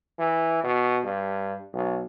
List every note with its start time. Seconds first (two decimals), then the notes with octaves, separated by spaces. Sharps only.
0.19 E3
0.64 B2
1.04 G2
1.73 B1